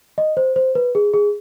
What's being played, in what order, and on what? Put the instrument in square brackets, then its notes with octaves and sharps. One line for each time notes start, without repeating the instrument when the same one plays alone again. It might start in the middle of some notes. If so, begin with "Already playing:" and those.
[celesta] D#5
C5
C5
B4
G#4
G#4